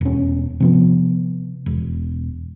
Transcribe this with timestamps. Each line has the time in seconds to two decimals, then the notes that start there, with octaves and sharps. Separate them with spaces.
0.01 E1 C#4
0.60 C3 F3 B3
1.66 E1